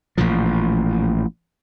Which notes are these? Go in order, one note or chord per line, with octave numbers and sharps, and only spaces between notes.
A1 A#2 F3